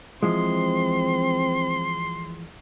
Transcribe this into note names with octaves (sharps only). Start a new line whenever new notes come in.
E3 F3 G#3 C4 C6